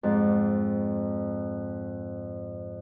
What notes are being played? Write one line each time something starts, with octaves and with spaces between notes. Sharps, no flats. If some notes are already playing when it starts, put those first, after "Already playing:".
F2 G#2